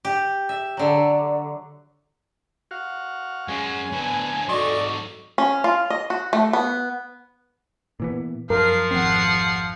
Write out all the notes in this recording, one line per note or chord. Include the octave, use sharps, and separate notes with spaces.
G4
E5
D3 F#3
F#4 F5
F#2 G#3 C#4 G#5
D3 F#3 B3
G#2 F#3 F#4 A4 D5 D#5 C#6
C#4
F4
D#5
F#4
A3
B3
A#2 E3 B3
F#2 F3 A#4 C7
G#1 F2 C4 F#5 C7